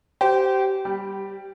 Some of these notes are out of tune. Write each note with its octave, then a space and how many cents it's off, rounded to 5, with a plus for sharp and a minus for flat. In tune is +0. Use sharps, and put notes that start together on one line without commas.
G4 -25 C5 -15
G3 +0 G4 +0